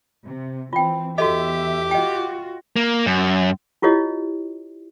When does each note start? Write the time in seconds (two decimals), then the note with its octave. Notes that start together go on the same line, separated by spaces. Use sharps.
0.24 C3
0.73 E3 C4 F4 G5
1.18 E2 F#4 G4 A4 D#5 E5
1.91 F4 F#4 D#5 G5
2.76 A#3
3.06 F#2
3.82 E4 F4 G4 C#5 D#5